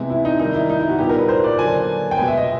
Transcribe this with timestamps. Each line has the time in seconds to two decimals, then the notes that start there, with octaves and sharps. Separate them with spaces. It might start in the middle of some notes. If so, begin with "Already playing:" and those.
Already playing: C3 E3 G#3 B3 E4
0.10 E4
0.25 D#4
0.39 D#3 G3 A#3 D#4
0.54 E4
0.70 D#4
0.80 E4
0.89 F#4
0.98 A#2 G3 B3 G4
1.09 A#4
1.19 B4
1.29 C5
1.44 D5
1.58 D3 F#3 A#3 G#5
2.11 G5
2.18 B2 G#3 B3 G#5
2.28 E5
2.37 D#5